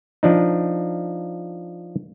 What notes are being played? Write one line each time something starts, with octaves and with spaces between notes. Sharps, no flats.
F3 D4 D#4